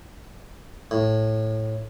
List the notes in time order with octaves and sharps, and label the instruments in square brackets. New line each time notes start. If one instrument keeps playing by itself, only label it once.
[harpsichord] A2